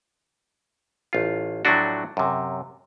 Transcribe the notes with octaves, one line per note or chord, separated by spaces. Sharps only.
A1 F4
A2 F3 F#3 A3 D4 F#4
F#2 C3